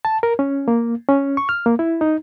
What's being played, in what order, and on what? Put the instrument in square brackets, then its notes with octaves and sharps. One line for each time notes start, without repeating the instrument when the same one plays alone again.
[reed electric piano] A5
A#4
C#4
A#3
C#4
C#6
F6
A#3
E4
D#4